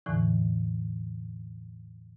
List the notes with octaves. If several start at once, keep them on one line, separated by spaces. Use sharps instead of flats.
E2 A2 D3 E3